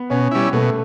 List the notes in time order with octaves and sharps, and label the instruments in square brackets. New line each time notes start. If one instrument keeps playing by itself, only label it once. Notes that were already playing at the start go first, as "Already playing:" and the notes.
Already playing: [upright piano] B3
[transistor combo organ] B2 [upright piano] C#4
[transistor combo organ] G3 C#4 E4
[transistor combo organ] B2 [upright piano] A3